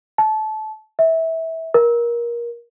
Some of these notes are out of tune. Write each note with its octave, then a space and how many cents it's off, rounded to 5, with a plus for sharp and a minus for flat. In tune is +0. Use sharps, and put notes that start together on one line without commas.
A5 -25
E5 -20
A#4 +20